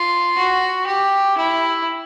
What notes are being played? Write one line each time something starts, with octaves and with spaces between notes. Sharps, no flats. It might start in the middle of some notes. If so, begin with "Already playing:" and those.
Already playing: F4
F#4
G4
E4